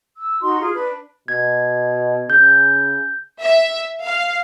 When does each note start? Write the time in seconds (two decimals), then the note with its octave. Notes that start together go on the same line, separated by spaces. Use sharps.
0.17 E6
0.42 D#4 F#4 D#5 C6
0.60 F4 G#4
0.74 D4 B4
1.28 B2 G#6
2.30 C#3 G6
3.39 E5
4.03 F5